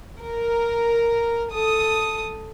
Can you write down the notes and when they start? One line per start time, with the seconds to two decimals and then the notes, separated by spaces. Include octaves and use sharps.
0.22 A#4
1.53 A4 D#6